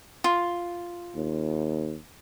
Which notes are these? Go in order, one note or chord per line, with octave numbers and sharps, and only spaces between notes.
F4
D#2